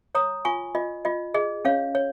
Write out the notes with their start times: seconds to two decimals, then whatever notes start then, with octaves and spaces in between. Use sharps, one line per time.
0.15 C#5 A#5 D#6
0.45 F4 G#5 C#6
0.75 F4 D#5
1.05 F4 D#5
1.34 G#4 D#5
1.65 C#4 C#5 F5
1.95 C#5